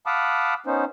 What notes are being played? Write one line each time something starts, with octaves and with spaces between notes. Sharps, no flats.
F5 F#5 A5 B5 D6 D#6
B3 C#4 D#4 C5